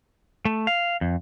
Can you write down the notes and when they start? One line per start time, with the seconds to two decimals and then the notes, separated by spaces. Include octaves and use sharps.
0.45 A3
0.67 F5
1.01 F2